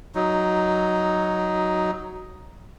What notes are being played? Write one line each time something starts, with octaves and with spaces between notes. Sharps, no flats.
F#3 D#4